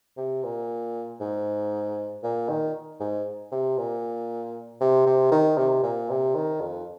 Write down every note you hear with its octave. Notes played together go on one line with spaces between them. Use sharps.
C3
A#2
G#2
A#2
D#3
G#2
C3
A#2
C3
C3
D#3
C3
A#2
C3
D#3
F2